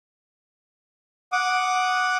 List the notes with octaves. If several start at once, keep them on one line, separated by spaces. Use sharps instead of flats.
F#5 D6 D#6